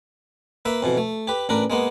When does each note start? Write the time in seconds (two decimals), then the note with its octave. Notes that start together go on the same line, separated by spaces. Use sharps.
0.65 A#3 B4 E5
0.83 F2 B2 E3
0.98 A3
1.27 G4 B4
1.49 A1 D4 A#4 B4
1.70 G#3 A#3 B3